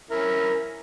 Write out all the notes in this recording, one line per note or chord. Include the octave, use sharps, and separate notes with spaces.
C#4 E4 A#4